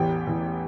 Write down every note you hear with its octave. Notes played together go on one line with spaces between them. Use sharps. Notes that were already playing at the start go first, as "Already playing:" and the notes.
Already playing: A1 E2 G4 G5
E2